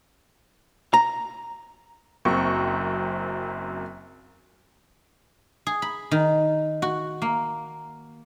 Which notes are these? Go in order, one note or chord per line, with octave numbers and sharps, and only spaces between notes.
A#5
F#1 F#2 C4 G5 C#6
G#4
B5
D#3
F#4
A#3